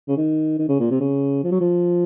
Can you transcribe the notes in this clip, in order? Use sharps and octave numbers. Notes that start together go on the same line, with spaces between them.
C#3
D#3
D#3
C#3
A#2
C3
C#3
F3
F#3
F3